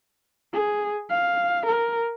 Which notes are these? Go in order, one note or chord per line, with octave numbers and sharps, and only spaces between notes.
G#4
F5
A#4